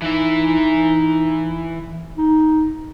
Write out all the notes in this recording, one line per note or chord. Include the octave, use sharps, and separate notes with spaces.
E3 D#4 E5
D#4